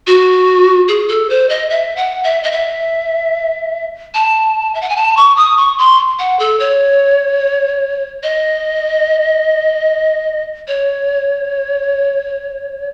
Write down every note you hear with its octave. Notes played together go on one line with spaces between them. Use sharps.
F#4
G#4
A4
C5
D#5
E5
F#5
E5
D#5
E5
A5
E5
F#5
G#5
A5
C#6
D#6
C#6
C6
F#5
A4
C#5
D#5
C#5